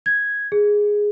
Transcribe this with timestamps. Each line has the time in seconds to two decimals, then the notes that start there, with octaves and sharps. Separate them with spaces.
0.06 G#6
0.52 G#4